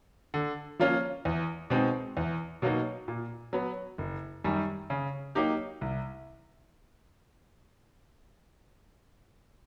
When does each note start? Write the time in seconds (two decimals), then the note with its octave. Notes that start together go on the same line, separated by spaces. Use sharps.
0.34 D3
0.79 F3 A#3 C#4 F4
1.25 E2
1.70 B2 G#3 C4 D#4
2.17 E2
2.62 B2 F#3 A#3 D#4
3.08 A#2
3.53 F#3 B3
3.98 F#1
4.44 F#2 D#3 G3
4.90 C#3
5.35 F#3 A#3 D#4 G4
5.81 C2